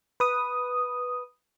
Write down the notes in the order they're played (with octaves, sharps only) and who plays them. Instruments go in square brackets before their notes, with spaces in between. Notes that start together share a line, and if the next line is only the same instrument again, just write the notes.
[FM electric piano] B4 D#6